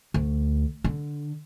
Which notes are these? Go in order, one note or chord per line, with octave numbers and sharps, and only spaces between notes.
D2
D3